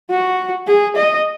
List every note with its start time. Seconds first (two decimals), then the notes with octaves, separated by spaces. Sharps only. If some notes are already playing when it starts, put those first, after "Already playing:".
0.10 F#4
0.67 G#4
0.96 D#5